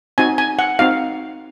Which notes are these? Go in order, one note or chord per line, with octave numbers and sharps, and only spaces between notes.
C4 D#4 F#4 G#5
G#5
F#5
C4 D#4 F#4 F5